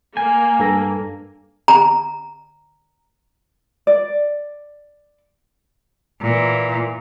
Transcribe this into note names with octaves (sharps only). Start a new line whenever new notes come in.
A#3 G#5
G2 A4 A#6
A#5
D5
A#2 E3